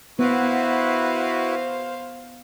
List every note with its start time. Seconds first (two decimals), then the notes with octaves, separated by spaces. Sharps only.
0.19 B3 E4 F#4 B4 C5 F5